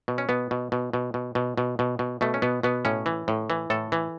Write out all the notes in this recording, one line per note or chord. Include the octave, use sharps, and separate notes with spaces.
B2
C#4
B2 B3
B2
B2
B2
B2
B2
B2
B2
B2
B2 A3
C#4
B2 B3
B2 B3
A2 C#4
E3
A2
E3
A2 A4
E3